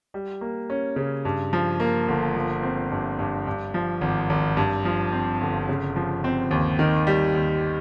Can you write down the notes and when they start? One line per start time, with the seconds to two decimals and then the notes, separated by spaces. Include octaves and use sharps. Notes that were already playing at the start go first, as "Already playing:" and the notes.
0.14 G3
0.41 A#3
0.70 C#4
0.96 C#3
1.25 G2
1.53 F3
1.80 A#3
2.08 G1
2.35 F3
2.63 C4
2.91 G2
3.19 G2
3.47 G2
3.74 F3
4.01 G#1
4.30 G#1
4.57 G2
4.85 F3
5.12 C4
5.41 G1
5.69 C#3
5.96 F3
6.24 C4
6.51 D#2
6.79 D#3
7.07 G3
7.35 D#2